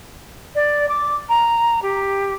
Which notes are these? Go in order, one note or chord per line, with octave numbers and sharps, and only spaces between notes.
D5
D6
A#5
G4